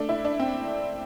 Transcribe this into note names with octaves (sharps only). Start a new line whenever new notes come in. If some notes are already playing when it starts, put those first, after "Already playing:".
Already playing: A3 D4
E4
D4
C4